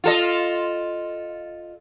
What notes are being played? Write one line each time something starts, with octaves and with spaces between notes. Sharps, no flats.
F4 A4 D#5